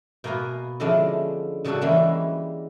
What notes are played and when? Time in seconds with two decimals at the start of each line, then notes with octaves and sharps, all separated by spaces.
0.24 B2 A#3 A#4 B4 G#5
0.80 D3 F3 G#3 C#4 D4 E4
1.65 C#3 F#3 G3 D4 F#4 A4
1.81 E3 G3 G#3 A#3 C#4 E4